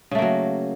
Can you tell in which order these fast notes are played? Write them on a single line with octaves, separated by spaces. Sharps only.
C#3 A3 A#3 F#3